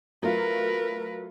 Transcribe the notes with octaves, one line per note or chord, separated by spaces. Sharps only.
F#3 A3 F4 A#4 B4